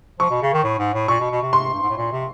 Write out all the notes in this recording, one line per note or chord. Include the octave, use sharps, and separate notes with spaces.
F3 C#6
B2
C#3
D#3
A2
G#2
A2
A#2 C#6
B2
B2
C3
C6
G2
G#2
A2
A#2
C3